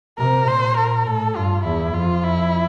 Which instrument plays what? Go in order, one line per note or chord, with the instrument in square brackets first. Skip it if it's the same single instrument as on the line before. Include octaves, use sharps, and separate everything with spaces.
[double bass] C3 [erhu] A#4
[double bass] A#2 [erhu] C5
[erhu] A#4
[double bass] A2 [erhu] A4
[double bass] G2 [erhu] F4
[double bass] E2 [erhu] E4
[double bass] F2 [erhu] F4
[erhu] E4